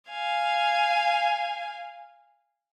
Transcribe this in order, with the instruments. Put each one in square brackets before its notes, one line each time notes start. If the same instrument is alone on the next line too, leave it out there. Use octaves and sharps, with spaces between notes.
[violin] F5 G#5